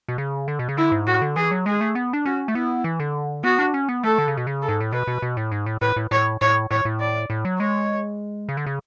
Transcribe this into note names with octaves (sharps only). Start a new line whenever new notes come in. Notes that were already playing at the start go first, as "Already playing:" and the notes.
B2
C#3
D3
B2
C#3
D3 E4
G#2
A2 F#4
D3
E3 G#4
F#3
G#3 G#4
A3
B3
D4
C#4 F#4
A3
B3 E4
E3
D3
B3 F#4
D4
C#4
B3
A3 A4
D3
C#3
B2
C#3
A4
G#2
A2
B2 B4
B2
B2
A2
G#2
A2
A2 B4
A2
A2 C#5
A2 C#5
A2 C#5
A2
D5
A2
F#3
G#3 C#5
C#3
D3
C#3